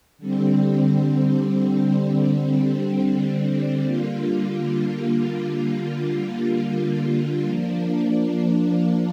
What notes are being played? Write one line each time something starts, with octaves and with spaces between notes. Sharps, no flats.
D3 G3 C4
D3 G3 A#3 F4
F3 A#3 D4